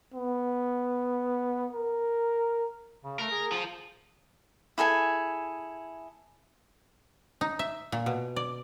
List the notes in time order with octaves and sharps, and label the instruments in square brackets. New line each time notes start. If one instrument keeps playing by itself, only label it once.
[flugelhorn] B3
A#4
[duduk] C#3
[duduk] A3 [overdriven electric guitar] A#4
[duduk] G#4
[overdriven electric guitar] F3
[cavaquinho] E4 G#4 A4 G#5
[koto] D#4
E5
A#2
B2
D5